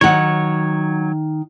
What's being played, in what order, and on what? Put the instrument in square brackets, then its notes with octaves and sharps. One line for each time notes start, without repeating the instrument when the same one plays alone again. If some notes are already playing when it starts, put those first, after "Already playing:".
[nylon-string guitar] D#3 F#5 [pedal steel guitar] F#3 C#5